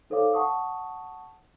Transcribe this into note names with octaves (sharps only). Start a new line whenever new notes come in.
D#4 A4 C5 C#5 F5 D6
F#5 A5 C#6 D#6